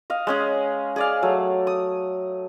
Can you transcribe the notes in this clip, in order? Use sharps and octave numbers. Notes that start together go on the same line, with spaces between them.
D#5 F5
G#3 C#4 G#4
G#4 D5 F5
F#3 A3
D#6